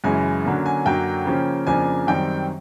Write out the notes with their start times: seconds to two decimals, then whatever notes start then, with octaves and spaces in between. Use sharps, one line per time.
0.04 F#2 C#3 E3 G#3 G#5
0.45 D3 F#3 A#3 C#4
0.66 G#5
0.85 F#2 D3 F#3 A#3 G5
1.26 C#3 F3 A#3 C#4
1.67 F2 C#3 F3 A#3 D4 G#5
2.07 F#2 D#3 G3 C4 G5